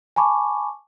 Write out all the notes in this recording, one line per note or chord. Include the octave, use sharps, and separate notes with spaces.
G#5 A5 B5 C#6 D6